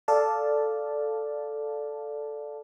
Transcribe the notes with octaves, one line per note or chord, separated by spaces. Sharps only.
A4 D5 F5 A5